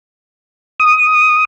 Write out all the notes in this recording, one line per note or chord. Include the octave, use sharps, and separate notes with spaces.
D#6